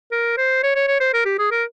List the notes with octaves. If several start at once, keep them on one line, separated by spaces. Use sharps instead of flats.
A#4
C5
C#5
C#5
C#5
C5
A#4
G4
G#4
A#4